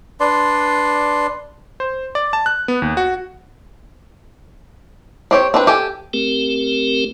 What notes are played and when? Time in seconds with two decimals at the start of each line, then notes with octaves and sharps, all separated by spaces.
0.20 D4 B4 D5 C6
1.80 C5
2.15 D5
2.33 A5
2.46 F#6
2.68 B3
2.82 D#2
2.97 F#4
5.31 C4 G4 C#5
5.54 C4 D4 B4
5.67 G4 A4 G#5
6.14 A3 C4 G4 A#4